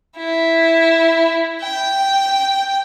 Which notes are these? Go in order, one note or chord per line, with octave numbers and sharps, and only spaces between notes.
E4
G5